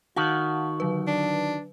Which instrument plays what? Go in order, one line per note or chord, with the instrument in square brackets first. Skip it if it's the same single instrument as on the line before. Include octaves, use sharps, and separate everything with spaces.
[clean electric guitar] D#3 F#4 [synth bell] F5 F#5 A5
[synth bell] D3 F#3 B4
[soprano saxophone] D4